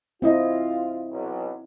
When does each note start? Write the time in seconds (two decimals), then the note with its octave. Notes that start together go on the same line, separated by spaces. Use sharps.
0.22 C4 E4 F4 D#5
1.12 B1